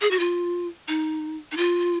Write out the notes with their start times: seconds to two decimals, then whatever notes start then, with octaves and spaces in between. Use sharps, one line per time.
0.01 G#4
0.11 F#4
0.19 F4
0.88 D#4
1.52 D#4
1.57 F4